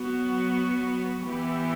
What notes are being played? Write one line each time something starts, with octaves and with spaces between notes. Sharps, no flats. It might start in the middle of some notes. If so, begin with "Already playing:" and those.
Already playing: F#3 B3 F#4
E3 B3 E4 G4